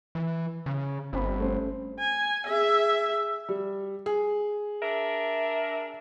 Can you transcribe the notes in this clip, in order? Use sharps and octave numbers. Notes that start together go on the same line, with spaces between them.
E3
C#3
G1 C4 B5
A3 C#4 C5
G#5
G#4 E5
G3
G#4
D4 A#4 E5